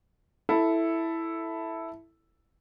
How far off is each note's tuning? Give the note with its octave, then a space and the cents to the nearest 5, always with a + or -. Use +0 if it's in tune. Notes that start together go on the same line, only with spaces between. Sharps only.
E4 +0 A4 +0